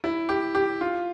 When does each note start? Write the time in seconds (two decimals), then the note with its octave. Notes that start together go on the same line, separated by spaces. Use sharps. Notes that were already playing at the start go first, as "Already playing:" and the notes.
0.04 E4
0.29 G4
0.55 G4
0.81 F4